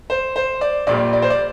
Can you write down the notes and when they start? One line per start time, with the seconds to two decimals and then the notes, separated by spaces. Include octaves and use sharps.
0.10 C5
0.36 C5
0.61 D5
0.87 A#1 A#2 G3 D5
1.13 D5
1.22 C5
1.30 D5